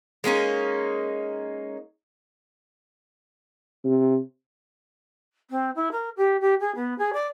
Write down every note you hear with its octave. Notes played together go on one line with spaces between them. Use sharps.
G#3 A#3 C#4 D#4
C3
C4
E4
A#4
G4
G4
G#4
B3
G#4
D5